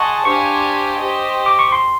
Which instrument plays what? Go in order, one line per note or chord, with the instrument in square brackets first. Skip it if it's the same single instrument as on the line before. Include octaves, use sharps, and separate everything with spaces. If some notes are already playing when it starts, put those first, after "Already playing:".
Already playing: [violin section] G#4 D#5 F#5 A5 [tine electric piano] C6 C#6
[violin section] D4 G4 C5 F5 G#5 [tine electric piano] C#6
[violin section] G4 C5 D#5
[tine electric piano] D6
C#6
C6